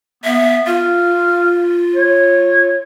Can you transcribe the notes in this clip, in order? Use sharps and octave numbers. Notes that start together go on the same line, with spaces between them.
B3 E5
F4 F5
C#5